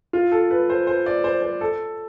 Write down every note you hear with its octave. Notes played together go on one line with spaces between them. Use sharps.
F4
A4
B4
C5
C5
D5
C5
C5
A4